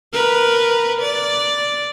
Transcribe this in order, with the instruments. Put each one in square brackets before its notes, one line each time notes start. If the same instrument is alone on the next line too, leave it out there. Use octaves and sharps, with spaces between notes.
[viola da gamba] A#4 B4
D5